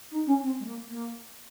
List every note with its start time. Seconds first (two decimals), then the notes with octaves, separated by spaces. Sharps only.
0.11 D#4
0.26 C#4
0.41 C4
0.60 G#3
0.65 A#3
0.89 A#3